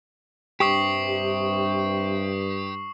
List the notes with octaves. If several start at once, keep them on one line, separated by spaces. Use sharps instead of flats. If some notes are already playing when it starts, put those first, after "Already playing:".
G2 C3 G4 C#6 D#6 C7